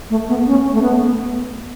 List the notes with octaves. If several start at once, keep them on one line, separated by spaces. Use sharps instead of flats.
A3
B3
C#4
A3
B3